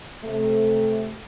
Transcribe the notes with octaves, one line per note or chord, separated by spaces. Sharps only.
C3 A3